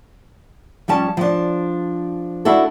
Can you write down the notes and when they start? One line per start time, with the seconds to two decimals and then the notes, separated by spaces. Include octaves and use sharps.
0.88 F3 G3 C#4 A5
1.17 F3 D4
2.45 D4 E4 F#4 A4